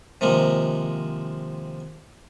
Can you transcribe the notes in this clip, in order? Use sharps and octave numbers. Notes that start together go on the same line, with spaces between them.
C3 D#3 F3 G#3 A#3